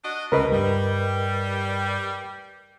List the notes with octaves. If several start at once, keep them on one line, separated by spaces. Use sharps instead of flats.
D4 F#4 D#5
C#2 B2 A#4 B4 D#5
G2 G3